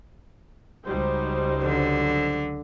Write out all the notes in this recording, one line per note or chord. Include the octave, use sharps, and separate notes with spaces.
C#2 F#3 G3 D#4 C5
D3